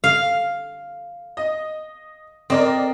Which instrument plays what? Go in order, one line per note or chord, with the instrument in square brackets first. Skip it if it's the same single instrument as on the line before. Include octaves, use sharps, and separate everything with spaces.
[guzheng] F5
[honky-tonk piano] D#5
[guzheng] C4 [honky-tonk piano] A#4 D5 D#5